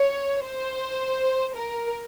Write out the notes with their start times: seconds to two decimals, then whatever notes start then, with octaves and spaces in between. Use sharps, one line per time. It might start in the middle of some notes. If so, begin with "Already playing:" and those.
Already playing: C#5
0.43 C5
1.55 A#4